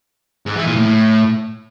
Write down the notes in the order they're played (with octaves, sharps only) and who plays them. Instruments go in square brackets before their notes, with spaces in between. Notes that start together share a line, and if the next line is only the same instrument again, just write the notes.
[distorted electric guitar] G#2
E3
A#2
A2